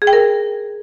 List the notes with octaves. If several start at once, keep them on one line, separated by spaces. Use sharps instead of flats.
G#4
G5
A#4